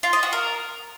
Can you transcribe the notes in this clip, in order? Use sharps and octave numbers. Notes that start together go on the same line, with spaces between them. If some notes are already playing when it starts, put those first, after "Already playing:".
F4
D#5
F#4
A#4